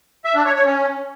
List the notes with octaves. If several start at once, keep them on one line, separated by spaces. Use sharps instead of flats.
E5
D4
C#5
C#5
C#4